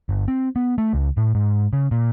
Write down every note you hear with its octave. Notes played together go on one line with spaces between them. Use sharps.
G1
C4
B3
A3
C#2
A2
G#2
C#3
A#2